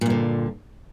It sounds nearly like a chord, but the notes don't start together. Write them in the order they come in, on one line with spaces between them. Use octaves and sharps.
A#2 G2 D3